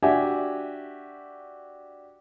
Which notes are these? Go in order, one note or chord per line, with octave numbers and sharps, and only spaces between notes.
D4 F#4 G4 E5 G#5